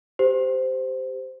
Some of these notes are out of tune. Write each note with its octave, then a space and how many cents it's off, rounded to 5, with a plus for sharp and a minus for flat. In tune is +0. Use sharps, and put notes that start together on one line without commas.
G4 +0 C5 -15